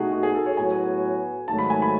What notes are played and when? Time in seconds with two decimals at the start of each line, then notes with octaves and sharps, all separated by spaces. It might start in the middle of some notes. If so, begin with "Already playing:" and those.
Already playing: B2 A3 D#4 F#4 G#4
0.12 F#4
0.23 G#4
0.34 A4
0.46 C#5
0.56 A2 F#3 B3 F#4 G#5
1.48 G#2 D#3 F#3 A3 A5
1.59 B5
1.70 G#5
1.82 B5